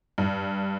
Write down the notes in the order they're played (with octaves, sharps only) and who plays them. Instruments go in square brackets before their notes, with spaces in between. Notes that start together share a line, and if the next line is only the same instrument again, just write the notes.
[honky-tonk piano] G2